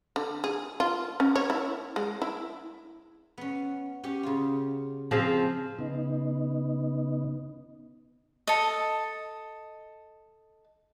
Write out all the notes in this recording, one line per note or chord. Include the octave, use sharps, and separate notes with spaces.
D3
G#4
F4
C#4
C#5
E4
G#3
E4
B3 C#4
C#4 G4
C#3 F4
F3 C4 G#4
C#3 B3 D#4
A4 D#5